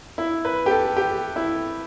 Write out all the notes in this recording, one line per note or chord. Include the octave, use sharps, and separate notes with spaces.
E4
B4
G4
A4
G4
E4